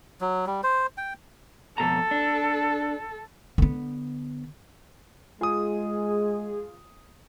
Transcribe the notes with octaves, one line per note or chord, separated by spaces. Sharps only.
F#3
G3
C5
G5
F2 B2 A4 A#5
D4
D3 B3
G#3 F4 G#4 D#6